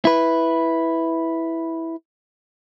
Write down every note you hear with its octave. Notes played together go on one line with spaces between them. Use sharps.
E4 B4